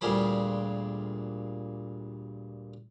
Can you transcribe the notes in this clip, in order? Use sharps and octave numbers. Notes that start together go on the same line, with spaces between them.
D2 A#2 G3 G#4 C5 B5